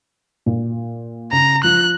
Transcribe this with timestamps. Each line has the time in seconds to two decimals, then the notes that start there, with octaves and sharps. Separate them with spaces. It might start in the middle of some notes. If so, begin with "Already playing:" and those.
0.46 A#2
1.32 C#3 A#5
1.64 F3 F#6